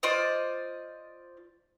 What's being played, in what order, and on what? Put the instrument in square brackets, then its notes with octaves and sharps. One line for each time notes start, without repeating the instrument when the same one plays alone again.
[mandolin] F4 C5 D5 D#5